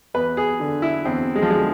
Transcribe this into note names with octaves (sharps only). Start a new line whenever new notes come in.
E2 B4
G#4
D3
E4
E2 C4
G#3
F3
D3 G#3